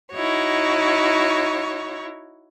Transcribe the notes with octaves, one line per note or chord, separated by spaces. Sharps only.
D#4 E4 F#4 C#5